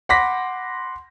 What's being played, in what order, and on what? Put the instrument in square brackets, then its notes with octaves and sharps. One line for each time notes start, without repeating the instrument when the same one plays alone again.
[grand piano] F#5 B5 C6 D6 A#6 B6